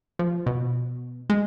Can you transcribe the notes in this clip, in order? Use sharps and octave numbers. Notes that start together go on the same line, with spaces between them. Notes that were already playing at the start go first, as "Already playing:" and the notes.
F3
B2
G#3